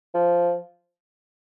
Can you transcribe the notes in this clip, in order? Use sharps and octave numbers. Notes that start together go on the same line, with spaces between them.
F3